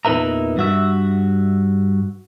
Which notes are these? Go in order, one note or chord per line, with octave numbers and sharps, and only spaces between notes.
E2 A#2 D#4 B4 E5 A#5
G2 F#4 E5